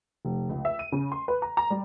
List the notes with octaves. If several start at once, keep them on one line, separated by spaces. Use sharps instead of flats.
F1
C#2
E5
D#7
C#3
C6
B4
A#5
A#5
G3